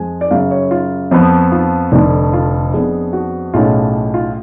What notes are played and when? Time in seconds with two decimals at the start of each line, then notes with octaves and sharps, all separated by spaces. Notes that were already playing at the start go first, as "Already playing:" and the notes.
Already playing: F2 F3 G#3 G#5
0.21 D5
0.31 F#2 C#3 F#3 F5
0.51 C#5
0.71 F4
1.11 F2 F3 B3
1.52 F4
1.92 F1 F2 D3 D4
2.33 F4
2.73 F2 F3 G#3 B3 D4 G#4
3.13 F#4
3.54 B1 A2 G#3 C#4 F4
4.14 F4